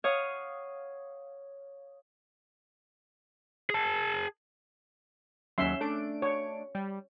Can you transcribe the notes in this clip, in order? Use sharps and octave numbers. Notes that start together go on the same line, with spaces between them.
C#5 F5 F#5 D#6
G#4 A5
D#2 F#3 C#4 E5 C6
A3 D4 D7
C#5
G3